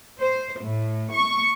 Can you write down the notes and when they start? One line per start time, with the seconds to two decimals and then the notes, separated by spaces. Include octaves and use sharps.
0.19 C5
0.62 A2
1.12 C#6